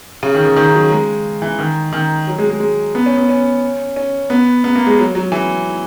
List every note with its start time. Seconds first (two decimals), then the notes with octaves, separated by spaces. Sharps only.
0.23 C#3
0.35 D#3
0.46 D#3
0.56 D#3
0.74 F#3
0.91 G#3
1.42 E3
1.59 D#3
1.93 D#3
2.27 F#3
2.38 G#3
2.50 G#3
2.60 G#3
2.95 B3
3.06 C#4
3.17 B3
3.29 C#4
3.96 C#4
4.30 B3
4.64 B3
4.76 A#3
4.87 G#3
4.99 F#3
5.15 F#3
5.32 E3